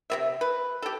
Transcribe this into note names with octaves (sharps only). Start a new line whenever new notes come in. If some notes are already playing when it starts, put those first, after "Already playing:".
C3 B3 E5
B4
G4 A4